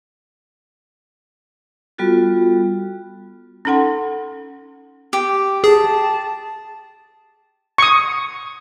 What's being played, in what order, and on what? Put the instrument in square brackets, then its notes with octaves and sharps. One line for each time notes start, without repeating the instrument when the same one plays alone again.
[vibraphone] G3 B3 F4 F#4 A4
[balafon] C#4 D#4 A4 F#5 C6
[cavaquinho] G4
[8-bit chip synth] G#4 [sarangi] A5
[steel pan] C#6 D#6